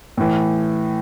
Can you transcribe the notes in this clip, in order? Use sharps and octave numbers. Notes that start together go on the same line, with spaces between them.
A2 E3